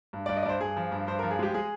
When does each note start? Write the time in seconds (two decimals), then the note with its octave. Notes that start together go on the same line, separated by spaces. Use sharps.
0.13 G2
0.26 G2 D5
0.37 D#5
0.43 D5
0.45 G2 C5
0.60 G2 G#4
0.77 F3
0.92 G2
1.07 G2 C5
1.19 A#4
1.23 F3
1.31 G#4
1.39 G#3 G4
1.54 G#3 G#4